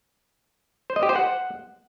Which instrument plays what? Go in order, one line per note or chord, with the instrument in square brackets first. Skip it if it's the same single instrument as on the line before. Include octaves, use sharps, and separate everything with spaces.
[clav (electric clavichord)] C5
D#5
G4
C5
F#5